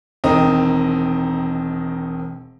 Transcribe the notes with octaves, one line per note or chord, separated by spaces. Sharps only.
E1 D#3 C4 D#5 A#5